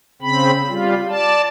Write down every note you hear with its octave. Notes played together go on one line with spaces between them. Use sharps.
C#3 C4 B5
G3 F4
D5 A5